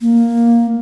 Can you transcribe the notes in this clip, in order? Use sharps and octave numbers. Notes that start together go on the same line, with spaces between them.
A#3